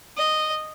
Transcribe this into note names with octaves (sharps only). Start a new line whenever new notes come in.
D#5